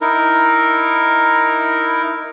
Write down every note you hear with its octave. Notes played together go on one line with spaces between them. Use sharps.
D#4 E4 A#4